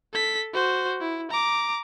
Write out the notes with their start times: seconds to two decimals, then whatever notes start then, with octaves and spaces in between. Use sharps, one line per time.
0.13 A4 B6
0.53 F#4 C5
1.01 E4
1.31 A#5 D6